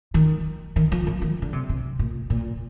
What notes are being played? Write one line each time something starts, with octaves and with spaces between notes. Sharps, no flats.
D#3
D#3
F3
F3
D#3
D3
C3
C3
A#2
A#2